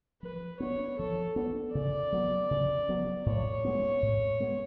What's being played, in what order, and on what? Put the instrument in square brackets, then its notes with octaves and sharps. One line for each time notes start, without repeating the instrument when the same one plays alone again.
[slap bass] F3 [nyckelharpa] B4
[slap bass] B3 D4 [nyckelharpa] C#5
[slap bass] F3 [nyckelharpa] A4
[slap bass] B3 D4
[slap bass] C#3 [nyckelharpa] D5
[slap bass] F#3 B3
C#3
F#3 B3
[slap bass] A2 [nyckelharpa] C#5
[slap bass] G#3 B3
A2
G#3 B3